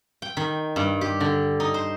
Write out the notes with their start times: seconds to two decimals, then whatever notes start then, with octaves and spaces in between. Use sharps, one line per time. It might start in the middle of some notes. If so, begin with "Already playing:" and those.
0.22 G5
0.37 D#3
0.76 G2
1.01 G4
1.20 D3
1.60 D#4
1.74 C5